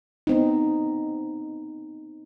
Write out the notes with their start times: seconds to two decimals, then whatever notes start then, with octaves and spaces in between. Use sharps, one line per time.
0.27 B3 C4 D#4